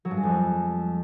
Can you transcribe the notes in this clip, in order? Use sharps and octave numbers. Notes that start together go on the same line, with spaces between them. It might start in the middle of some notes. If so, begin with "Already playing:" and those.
F#3
G2
G#3
F2